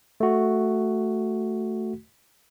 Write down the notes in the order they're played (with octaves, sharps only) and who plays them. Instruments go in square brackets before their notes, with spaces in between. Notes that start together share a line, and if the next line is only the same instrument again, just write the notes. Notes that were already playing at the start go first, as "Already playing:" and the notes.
[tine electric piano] A3 F#4